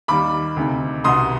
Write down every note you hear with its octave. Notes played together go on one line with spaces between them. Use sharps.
D#2 D#3 G3 B5 D6
D2 C3 D#3
C2 B2 B3 C6 D#6